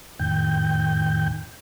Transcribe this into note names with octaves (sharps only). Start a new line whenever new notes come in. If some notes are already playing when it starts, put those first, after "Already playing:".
F2 A2 D#3 G5 G6